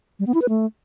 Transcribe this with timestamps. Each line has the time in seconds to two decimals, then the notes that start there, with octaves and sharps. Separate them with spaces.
0.19 G3
0.27 B3
0.34 E4
0.42 B4
0.49 A3